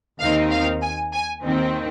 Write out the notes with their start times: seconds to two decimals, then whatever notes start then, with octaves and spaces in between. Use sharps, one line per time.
0.20 D#2 D#3 C4 D#4 F5
0.51 F5
0.82 G#5
1.13 G#5
1.43 D#2 D#3 C4